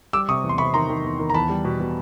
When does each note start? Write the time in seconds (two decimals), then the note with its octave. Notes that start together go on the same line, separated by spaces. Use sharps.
0.13 G3 D6 E6
0.28 C3 C#6 D#6
0.44 E2
0.49 C6
0.58 C3 B5 C#6
0.74 D#3 A#5 C6
0.90 D#3
1.04 E2
1.19 D#3
1.30 A#5
1.34 E2 A5 B5
1.49 G3
1.65 B2
1.80 B2